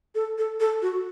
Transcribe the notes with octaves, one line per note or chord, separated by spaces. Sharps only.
A4
A4
A4
F#4